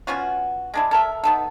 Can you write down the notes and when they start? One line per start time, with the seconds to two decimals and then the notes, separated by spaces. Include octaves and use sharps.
0.07 B3 C#4 F4 F#4
0.74 G#3 D4 E4
0.91 A4 A#4 E5
1.24 B3 D#4 A4